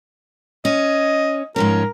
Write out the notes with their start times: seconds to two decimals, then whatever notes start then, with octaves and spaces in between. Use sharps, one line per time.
0.65 C#4 D#5
1.56 G#2 F3 C#4 A#4